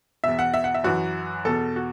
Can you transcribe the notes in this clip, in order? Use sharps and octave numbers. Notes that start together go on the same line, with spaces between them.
E2 B2 E5
F#5
E5
F#5
E5
F#2 E3 F#4
E2 B2 A4
F#4